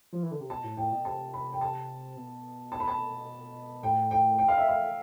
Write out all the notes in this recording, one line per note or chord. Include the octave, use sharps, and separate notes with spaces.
F3
E3
D3
C3
B2 A5
A2
A2 G5
B2
C3 A5
B5
G5
A5
B2
A5
B5
A5
A2 G5
G5
G5
F5
E5
F5